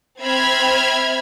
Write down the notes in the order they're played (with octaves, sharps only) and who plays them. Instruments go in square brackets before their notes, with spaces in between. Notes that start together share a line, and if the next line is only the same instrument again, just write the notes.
[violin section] C4 E5 B5 F6 G#6